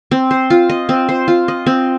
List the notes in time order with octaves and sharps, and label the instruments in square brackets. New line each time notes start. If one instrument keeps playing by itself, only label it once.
[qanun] C4
C5
F4
D#5
C4
C5
F4
D#5
C4